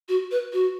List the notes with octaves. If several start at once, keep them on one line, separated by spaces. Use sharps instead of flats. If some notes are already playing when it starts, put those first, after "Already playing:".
F#4
B4
F#4